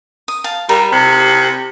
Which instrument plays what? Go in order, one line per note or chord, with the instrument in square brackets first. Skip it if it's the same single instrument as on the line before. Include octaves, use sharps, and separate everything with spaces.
[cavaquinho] D#6
F5 A5
[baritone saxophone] G3 [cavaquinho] A#4
[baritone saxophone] C3